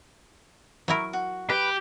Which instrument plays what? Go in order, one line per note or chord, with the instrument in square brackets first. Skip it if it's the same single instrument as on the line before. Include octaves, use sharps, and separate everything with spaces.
[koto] F#3 E4 A#4 [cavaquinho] C#6
[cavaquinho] F#4
[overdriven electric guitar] G4 [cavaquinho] B4